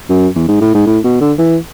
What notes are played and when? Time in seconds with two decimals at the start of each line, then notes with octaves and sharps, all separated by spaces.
0.10 F#2
0.35 E2
0.48 G#2
0.61 A2
0.74 G#2
0.87 A2
1.04 B2
1.21 D3
1.39 E3